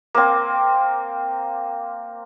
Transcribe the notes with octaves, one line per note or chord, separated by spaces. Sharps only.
A#3 C4